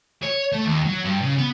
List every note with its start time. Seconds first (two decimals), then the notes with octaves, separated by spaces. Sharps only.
0.23 C#5
0.52 A3
0.66 D#2
0.86 F#3
1.04 G2
1.21 C#3
1.38 B3